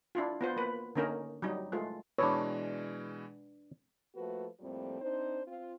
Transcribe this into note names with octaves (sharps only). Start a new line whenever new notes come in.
D4 E4 F4
B3 F4 C5
A#3 B4
D3 A#3 C#4 D#4 A#4
F#3 G3 D#4
G#3 A3 F4
B2 E3 G#3 D4 B4 C#5
F3 A3 A#3 F#4 A4 B4
F2 A2 F3 G3 A#3 C4
C4 D4 D#4 C5
C4 F4